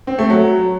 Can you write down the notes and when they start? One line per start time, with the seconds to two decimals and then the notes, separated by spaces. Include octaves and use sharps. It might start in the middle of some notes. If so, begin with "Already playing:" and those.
0.07 C4
0.19 A3
0.30 F#3